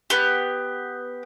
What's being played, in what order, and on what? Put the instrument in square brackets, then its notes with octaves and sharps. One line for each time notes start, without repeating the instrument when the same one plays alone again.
[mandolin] B3 G4